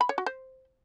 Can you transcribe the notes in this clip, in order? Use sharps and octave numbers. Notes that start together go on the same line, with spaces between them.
B5
C#5
F#4
C5